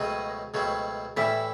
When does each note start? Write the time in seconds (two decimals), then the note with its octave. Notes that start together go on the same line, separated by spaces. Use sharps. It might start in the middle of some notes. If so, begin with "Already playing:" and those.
Already playing: C#2 B2 F#3 A3 C4 D#5
0.54 C#2 B2 F#3 A3 C4
1.17 A2 E3 G3 E5